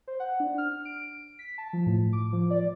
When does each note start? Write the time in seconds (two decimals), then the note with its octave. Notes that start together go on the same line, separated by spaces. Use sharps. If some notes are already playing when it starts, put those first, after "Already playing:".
0.07 C5
0.20 F#5
0.40 D4
0.58 F6
0.85 D7
1.39 B6
1.58 A5
1.73 F3
1.86 A2
2.13 D6
2.33 F3
2.50 D5